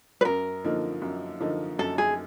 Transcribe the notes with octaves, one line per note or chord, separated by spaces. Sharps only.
B4
F#2 A#4
D3 F3 A#3 D#4
F#2
D3 F3 A#3 D#4
F#2 A4
G#4